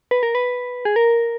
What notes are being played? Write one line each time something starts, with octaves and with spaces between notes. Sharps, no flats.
B4
A#4
B4
G#4
A#4